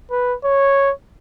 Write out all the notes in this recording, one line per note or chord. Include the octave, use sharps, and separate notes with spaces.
B4
C#5